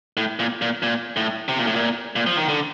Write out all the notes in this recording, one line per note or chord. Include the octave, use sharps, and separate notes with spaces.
A2
A#2
A#2
A#2
A2
C3
A#2
A2
A#2
A#2
F3
D#3
D3